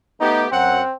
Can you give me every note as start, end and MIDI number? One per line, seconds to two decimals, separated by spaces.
0.20 0.48 57
0.20 0.48 59
0.20 0.44 63
0.20 0.48 67
0.52 0.81 42
0.52 0.81 54
0.52 0.92 60
0.52 0.81 78